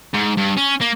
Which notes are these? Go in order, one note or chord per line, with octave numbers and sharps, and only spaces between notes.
G#2
G2
C#4
A#3